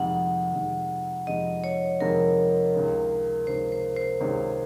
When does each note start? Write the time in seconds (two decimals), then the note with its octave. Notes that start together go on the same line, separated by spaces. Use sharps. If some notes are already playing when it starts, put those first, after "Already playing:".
Already playing: F2 C3 D#3 G#3 F#5
0.54 F2 C3 D#3 G#3
1.27 F2 C3 D#3 G#3 D#5
1.64 C#5
2.00 F2 C3 D#3 G#3 A#4
2.74 C#2 C3 D#3 G#3 C#4
3.47 C#2 C3 D#3 G#3 C#4 C5
3.72 C5
3.96 C5
4.20 C#2 C3 D#3 G#3 C#4